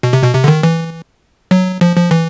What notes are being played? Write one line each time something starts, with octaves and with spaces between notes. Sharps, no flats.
B2
C3
B2
C3
D3
D#3
E3
F#3
F3
F3
E3